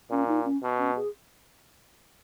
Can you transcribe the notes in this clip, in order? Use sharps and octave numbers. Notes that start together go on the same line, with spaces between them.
A#2 C#4
D#4
C#4
B2
C#4
G#4